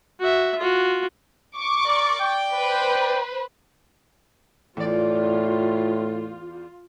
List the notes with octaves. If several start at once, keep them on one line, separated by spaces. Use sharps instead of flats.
F#4 E5
F4 F#4
C#6 D6
A#4 D5
D5 G5
B4 C5
E2 A2 F4 D5